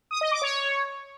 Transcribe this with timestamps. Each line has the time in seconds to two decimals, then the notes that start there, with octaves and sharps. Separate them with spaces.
0.11 D#6
0.21 D#5
0.31 D6
0.42 C#5